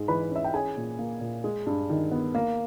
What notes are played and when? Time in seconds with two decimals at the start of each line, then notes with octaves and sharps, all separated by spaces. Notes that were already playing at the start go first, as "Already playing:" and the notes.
Already playing: G#2 G#3
0.08 E3 B4 B5
0.31 C#4 E5
0.44 G5
0.53 C#4 G#4 G#5
0.77 A#2
0.99 A#3
1.21 A#2
1.44 G#3
1.66 G2
1.90 D#3
2.11 B3
2.35 A#3